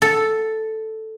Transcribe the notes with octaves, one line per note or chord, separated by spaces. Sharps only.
A4